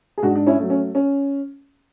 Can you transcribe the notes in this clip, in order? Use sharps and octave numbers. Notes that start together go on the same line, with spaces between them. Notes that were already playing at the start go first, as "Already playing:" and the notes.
G#4
G#2 D4 F#4
D4
C#4 E4
F#3 A3
C#4
C#4